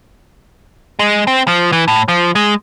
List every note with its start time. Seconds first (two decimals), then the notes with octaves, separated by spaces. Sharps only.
0.99 G#3
1.27 C4
1.48 F3
1.72 E3
1.88 A2
2.08 F3
2.35 G#3